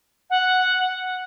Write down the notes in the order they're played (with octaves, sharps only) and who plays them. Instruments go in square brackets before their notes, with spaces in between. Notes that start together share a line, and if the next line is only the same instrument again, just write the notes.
[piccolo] F#5